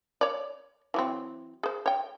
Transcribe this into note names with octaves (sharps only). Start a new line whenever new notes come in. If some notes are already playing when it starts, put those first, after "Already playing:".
C#5 D5
E3 F#3 C4
G#4 C5
C#5 G5